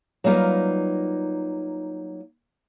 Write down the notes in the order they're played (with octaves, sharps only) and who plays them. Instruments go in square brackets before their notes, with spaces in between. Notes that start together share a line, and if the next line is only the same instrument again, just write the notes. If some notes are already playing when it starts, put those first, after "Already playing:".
[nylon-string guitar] F#3 G3 A#3 D#4 F4 B4